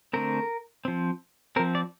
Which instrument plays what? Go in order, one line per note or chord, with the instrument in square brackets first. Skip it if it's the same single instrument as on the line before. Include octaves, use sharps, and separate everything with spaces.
[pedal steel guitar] D3 A3 C4 A#4
F3 C4
C4 A#4
F3
D5